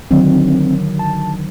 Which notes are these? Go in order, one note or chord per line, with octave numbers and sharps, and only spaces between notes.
D3 D#3 F#3 C4
A5